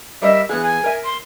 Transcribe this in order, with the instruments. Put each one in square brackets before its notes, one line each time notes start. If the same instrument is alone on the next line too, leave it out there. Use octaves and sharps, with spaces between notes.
[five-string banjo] G3 A#4 D#5 [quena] E5
[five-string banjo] E3 B3 G#4 [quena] F#6
[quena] G#5
[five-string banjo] A#4 E5
[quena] C6